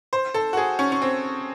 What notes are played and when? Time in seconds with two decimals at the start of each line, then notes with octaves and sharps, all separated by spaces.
0.13 C5
0.34 A4
0.53 F#4
0.57 G#4
0.79 C#4
0.92 C#4
1.02 C4